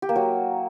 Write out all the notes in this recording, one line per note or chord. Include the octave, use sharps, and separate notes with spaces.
G4
A#3
F#3